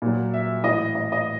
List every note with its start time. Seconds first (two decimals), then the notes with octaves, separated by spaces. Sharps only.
0.02 A#2 F#3
0.34 E5
0.64 A2 E3 D#5
0.95 D#5
1.12 D#5